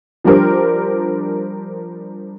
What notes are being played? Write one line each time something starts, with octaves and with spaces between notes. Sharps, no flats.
F3 G3 D4 G4 A#4 C5